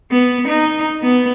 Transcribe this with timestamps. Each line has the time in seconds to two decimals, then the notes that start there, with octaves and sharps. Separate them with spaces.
0.11 B3
0.49 D#4
1.02 B3